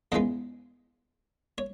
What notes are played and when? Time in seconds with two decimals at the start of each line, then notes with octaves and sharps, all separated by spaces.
0.12 E2 C#3 E3 G#3 B3 D#5
1.58 C#5